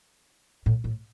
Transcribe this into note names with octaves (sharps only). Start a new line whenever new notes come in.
A2
A2